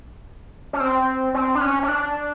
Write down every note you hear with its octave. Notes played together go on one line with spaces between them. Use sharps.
C#4
C4
C4
D4
C#4
C#4
D4